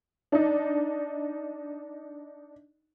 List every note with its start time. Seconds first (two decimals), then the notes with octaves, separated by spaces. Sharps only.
0.32 D4 D#4